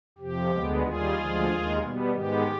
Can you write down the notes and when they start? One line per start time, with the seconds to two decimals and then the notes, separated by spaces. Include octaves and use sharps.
0.18 F2 C3 F3 G4
0.51 D2 D3 G#3 B3
0.82 D#2 D#3 G3 F4 G#4
1.15 D2 D3 F3 G#3
1.47 D#2 D#3 G#3
1.79 B2 G3 B3
2.11 G#2 D#3 G#3 B3 G4